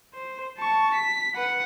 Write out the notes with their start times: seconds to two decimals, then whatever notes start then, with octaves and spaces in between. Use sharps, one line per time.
0.14 C5
0.58 A5 C#6
0.94 B6
1.35 B4 F#5